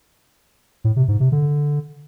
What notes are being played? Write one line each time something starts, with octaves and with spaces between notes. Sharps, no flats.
A2
C3
G#2
C3
D3